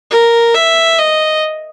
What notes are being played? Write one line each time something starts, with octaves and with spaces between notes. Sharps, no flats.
A#4
E5
D#5